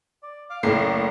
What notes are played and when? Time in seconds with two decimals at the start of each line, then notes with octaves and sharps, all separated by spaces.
0.23 D5
0.50 F5 D6
0.63 F#1 A2 A#3 D5 A#5 C7